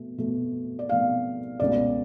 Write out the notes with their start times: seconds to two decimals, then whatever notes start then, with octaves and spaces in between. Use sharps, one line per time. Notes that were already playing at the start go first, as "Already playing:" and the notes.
Already playing: B2 A3
0.18 B2 A3
0.79 D5
0.89 B2 A3 F5
1.60 C#2 B2 A3 D5